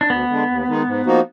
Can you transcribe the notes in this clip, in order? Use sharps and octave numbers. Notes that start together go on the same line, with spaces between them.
D4
D2 B3
D3 G#3 D4
D#2
D#3 G#3 D#4
G#2
F3 A#3 D#4 F#4